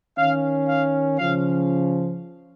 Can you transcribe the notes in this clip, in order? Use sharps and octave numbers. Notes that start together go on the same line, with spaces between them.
D#3 C#4 F5
F5
C#3 F3 C#4 F5